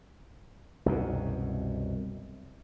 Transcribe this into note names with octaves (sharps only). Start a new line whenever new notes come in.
C2 F#2 B2